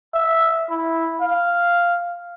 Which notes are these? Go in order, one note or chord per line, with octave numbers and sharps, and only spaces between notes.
E5
E4
F5